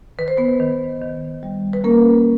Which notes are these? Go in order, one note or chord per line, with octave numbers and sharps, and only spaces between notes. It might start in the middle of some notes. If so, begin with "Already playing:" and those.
D#3 B4
C5
B3 B4
D#3
D#3
G3
B4
A#3 C#4 A#4